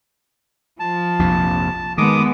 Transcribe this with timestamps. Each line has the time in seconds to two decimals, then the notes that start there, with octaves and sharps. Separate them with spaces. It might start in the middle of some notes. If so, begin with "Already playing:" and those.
0.80 F3 A5
1.19 A#1 F2 C3
1.98 D#3 G#3 B3 D6 D#6